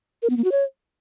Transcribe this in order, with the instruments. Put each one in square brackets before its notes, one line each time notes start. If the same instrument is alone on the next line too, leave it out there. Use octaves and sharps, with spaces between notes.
[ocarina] A#4
B3
A#3
F#4
C#5